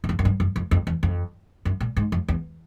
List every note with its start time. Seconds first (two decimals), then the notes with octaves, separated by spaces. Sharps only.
0.04 F#2
0.09 F2
0.19 F#2
0.25 G2
0.40 F#2
0.56 F2
0.71 F2
0.87 E2
1.03 F2
1.65 F#2
1.80 A#2
1.97 G#2
2.12 F2
2.28 E2